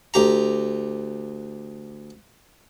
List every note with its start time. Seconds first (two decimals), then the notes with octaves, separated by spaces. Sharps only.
0.14 D2 G4 A#5